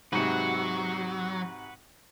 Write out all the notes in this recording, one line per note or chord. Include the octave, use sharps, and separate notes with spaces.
G#2 C3 F#3 F#4 B4